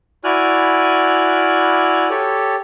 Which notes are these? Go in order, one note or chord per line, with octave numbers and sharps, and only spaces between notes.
E4 F#4 D5 G#5 F6 F#6
G4 A4 C#5